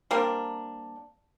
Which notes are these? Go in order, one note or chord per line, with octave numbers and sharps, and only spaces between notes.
G3 A#3 C4 D4